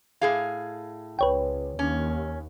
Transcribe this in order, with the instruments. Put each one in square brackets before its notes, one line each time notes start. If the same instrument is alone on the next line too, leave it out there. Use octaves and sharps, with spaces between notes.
[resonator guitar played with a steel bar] A2 G#4 F5
[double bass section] C#2 [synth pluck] B4 C#5 G5
[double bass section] D#2 [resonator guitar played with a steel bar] C#4